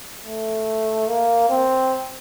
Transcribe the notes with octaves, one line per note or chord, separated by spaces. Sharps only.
A3
A#3
C4